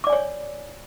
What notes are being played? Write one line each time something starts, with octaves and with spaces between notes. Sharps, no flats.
C#5 D5 G#5 D6